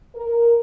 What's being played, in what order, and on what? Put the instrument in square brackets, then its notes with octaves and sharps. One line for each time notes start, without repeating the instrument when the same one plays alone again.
[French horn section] A#4